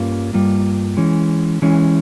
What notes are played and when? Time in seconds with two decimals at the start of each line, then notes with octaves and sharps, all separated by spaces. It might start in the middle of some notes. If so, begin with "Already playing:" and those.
Already playing: G2 G3 A#3 C#4 F4
0.33 G2 G3 A#3 F4
0.97 E3 G#3 C#4
1.62 E3 G#3 C#4